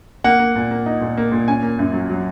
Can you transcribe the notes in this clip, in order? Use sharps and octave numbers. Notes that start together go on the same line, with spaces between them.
A#3 F#5
A#3
A#2
A#3
D#4
A#2
A#3
A#2
C#4 G#5
A#3
F#2
F#3
F#3